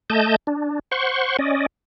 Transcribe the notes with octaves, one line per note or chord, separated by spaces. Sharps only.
A3 D#5 A5 G6
D4
C5 F#5 C6 C#6
C#4 D5 D#5